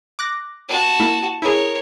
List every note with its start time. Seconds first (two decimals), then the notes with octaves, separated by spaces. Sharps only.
0.19 D6 F#6 A#6
0.68 F#4 A5
1.00 A#3 E4
1.42 E4 G#4 A#4 C#5